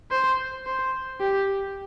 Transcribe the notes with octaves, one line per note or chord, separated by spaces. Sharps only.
C5
C5
G4